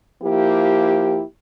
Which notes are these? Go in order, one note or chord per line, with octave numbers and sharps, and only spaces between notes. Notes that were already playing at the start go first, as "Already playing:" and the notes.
F3 A#3 E4 G4